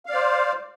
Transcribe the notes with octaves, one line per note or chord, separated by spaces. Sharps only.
C5 D5 F5